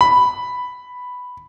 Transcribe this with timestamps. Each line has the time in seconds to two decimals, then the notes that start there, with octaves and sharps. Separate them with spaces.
0.01 B5